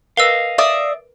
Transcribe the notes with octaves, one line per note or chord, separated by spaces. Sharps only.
A#4 B4 D#5 F5 E6
D5 E5 D#6